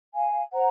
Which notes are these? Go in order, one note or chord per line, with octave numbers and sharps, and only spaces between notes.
F5 G#5
C5 F#5 A#5